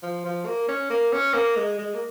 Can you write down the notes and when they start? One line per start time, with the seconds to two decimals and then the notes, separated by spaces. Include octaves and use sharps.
0.03 F3
0.25 F3
0.46 A#3
0.69 C#4
0.90 A#3
1.13 C#4
1.34 A#3
1.56 G#3
1.78 G#3
1.94 A#3